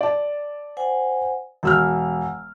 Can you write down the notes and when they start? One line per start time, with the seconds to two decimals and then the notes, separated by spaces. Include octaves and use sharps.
0.01 D5 A5
0.77 C5 F#5 G#5
1.63 E1 F#5 G#5 E6 F6